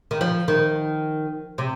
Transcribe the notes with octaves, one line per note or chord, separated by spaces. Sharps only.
D#3
F3
D#3
C3